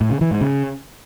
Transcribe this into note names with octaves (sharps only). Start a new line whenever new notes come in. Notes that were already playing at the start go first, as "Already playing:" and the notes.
A2
C#3
E3
G#2
C#3